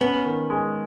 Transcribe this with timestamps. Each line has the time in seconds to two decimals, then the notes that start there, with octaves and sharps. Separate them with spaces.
0.01 B3 C#4
0.25 D#3
0.50 G#3